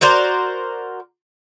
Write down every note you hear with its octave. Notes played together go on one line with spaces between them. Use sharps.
F#4 A#4 C5 D5